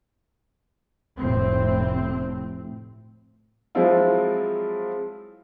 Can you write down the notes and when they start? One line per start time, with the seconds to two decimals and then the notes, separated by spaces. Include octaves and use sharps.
1.19 F1 A2 C4
3.75 F3 F#3 G#3 C4 E4 F4